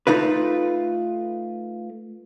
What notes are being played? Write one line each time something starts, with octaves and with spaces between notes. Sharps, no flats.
A3 D#4 F4 B4